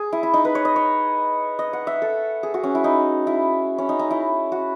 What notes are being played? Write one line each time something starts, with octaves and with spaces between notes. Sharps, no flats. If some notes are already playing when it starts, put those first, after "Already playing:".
Already playing: G#4
E4
E4
D#4
B4
C#5
D#5
C#5
D#5
F#5
E5
A4
G#4
F#4
C#4
E4
D#4
E4
C#4
D#4
D#4
E4
F#4